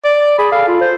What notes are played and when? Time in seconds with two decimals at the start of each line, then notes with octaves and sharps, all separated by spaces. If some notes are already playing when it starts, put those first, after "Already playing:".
0.05 D5
0.38 G#4 B5
0.52 A4 F5
0.68 F4
0.81 C5